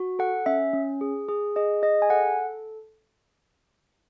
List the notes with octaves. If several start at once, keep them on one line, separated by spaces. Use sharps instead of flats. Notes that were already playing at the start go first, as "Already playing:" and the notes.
Already playing: F#4
A4 F#5
C#4 E5
C#4
G#4
G#4
G#4 D#5
G#4 D#5
G#5
A4 F#5